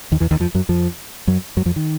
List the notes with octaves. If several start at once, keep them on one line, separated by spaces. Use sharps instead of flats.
D#2 D#3
E2 E3
D#2 D#3
F2 F3
F#2 F#3
F2 F3
F#2 F#3
F#2 F#3
F2 F3
D#3